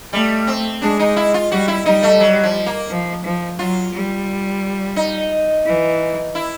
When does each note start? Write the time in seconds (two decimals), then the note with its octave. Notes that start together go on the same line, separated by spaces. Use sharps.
0.13 G3 A3
0.47 C4
0.81 G#3 D4
0.99 D#4
1.16 E4
1.34 F4
1.52 G3 F#4
1.68 E4
1.86 G3 D#4
2.03 A3
2.20 F#3
2.43 F3
2.66 A#3
2.89 F3
3.24 F3
3.59 F#3 F4
3.94 G3
4.96 D#4
5.66 E3
6.35 E4